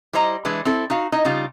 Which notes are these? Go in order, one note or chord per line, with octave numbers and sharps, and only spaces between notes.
G3 E4 C5 D#5 A#5
E3 G#3 D4 E4 B4
C4 E4 A4
D#4 F#4 F5
D#4 E4 D#5
C#3 G3 D#4 F4